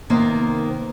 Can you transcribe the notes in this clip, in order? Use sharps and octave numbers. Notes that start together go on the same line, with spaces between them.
C3 D#3 A#3 B3 C5